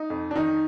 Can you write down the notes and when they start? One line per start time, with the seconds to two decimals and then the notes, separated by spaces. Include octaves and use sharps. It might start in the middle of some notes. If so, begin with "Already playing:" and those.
Already playing: D#4
0.10 F2
0.31 D4
0.36 D#3 D#4